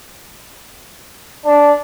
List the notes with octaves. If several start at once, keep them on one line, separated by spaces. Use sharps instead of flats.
D4